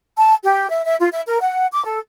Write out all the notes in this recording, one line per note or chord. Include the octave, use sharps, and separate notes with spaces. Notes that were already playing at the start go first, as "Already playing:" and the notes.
A5
G4
E5
E5
F4
E5
A#4
F#5
D6
A4